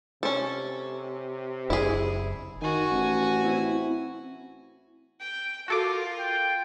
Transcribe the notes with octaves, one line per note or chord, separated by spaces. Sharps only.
C3 C#4 A4
F#1 E4 G#4
D#3 F#4 G#5
A1
C4 E4
G5
F4 F#4 A4 A#4 D6
G5